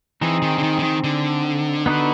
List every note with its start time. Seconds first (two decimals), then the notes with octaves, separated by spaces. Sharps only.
0.22 E3 C4 D#4 G#4
0.42 D#3
0.58 D3
0.63 D#3
0.79 D3
0.83 D#3
1.04 D3
1.86 B3 D#4 F#4 B4